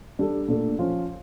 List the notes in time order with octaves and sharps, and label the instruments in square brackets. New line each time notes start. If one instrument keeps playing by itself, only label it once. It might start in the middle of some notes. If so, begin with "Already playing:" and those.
[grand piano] G3 D4 A4
A#2 A3 D4 A4
F3 C#4 F4